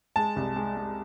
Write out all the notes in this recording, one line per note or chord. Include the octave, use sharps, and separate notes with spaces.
G#3 A5
C2
G#3
G#3